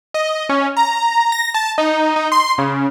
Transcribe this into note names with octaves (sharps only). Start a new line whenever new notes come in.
D#5
C#4
A#5
A#6
A5
D#4
D#4
C6
C#3